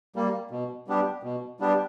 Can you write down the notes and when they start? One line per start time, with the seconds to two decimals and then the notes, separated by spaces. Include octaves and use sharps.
0.16 G3 A#3
0.51 B2
0.88 G3 B3 D4 G4
1.23 B2
1.60 G3 B3 D4 G4